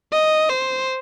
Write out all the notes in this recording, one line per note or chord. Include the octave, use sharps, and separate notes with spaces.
D#5
C5